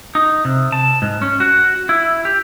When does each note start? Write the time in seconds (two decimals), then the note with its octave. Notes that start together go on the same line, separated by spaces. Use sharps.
0.15 D#4
0.45 C3
0.72 A5
1.02 G#2
1.22 C#4
1.40 F#4
1.89 E4
2.25 G4